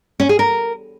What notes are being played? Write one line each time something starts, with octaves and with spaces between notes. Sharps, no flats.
C#4
G#4
A#4